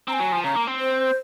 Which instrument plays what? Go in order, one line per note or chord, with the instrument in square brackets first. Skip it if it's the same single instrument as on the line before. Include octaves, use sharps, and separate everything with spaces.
[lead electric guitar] C4 [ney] A#5
[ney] G#5
[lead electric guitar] F#3
F3
[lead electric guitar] C#3 [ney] A#5
[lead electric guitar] A#3
C4
[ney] C5